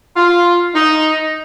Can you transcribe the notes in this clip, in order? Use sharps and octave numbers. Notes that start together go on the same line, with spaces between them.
F4
D#4